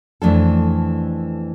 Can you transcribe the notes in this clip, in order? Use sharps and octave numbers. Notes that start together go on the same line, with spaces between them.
F2 E3 A3 D4 A4